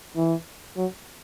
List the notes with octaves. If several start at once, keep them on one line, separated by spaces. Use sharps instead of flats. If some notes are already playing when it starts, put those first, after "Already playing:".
E3
F#3